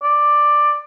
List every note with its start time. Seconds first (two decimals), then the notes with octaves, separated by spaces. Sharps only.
0.03 D5